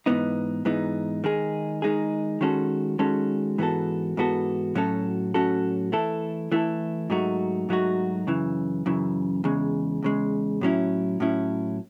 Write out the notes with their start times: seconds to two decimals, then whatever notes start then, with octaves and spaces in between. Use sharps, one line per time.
0.06 G#2 E3 B3 D#4
0.65 G#2 E3 B3 D#4
1.24 D#3 G#3 D#4 G#4
1.82 D#3 G#3 D#4 G#4
2.41 D#3 G#3 C#4 F#4 A4
2.99 D#3 G#3 C#4 F#4 A4
3.58 G#2 E3 B3 F#4 A4
4.17 G#2 E3 B3 F#4 A4
4.75 A2 F#3 C#4 F#4 A4
5.34 A2 F#3 C#4 F#4 A4
5.92 E3 A3 E4 A4
6.52 E3 A3 E4 A4
7.10 G#2 F#3 A3 D#4 F#4
7.69 G#2 F#3 A3 D#4 F#4
8.27 F#2 C#3 E3
8.86 F#2 C#3 E3
9.44 E2 C#3 G#3
10.03 E2 C#3 G#3
10.61 A2 F#3 C#4 E4
11.20 A2 F#3 C#4 E4